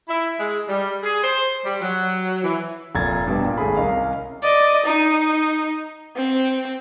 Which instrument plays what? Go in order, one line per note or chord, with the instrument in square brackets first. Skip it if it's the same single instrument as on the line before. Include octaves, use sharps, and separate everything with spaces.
[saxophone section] E4
G#3
G3
G#4
C5
G3
F#3
E3
[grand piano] F1 A#2 A#5 G#6 A6
G2 B2 B3 G4
A#2
G#1 A3 C#4 G#4 B5
C2 C#4 A#4 D#5 F5
[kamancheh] D5 D#5
D#4
C4